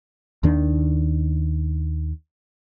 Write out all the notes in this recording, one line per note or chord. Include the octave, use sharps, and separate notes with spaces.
D#2 D#3 D4